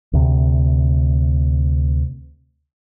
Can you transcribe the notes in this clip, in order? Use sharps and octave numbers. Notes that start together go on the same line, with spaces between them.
D2 C3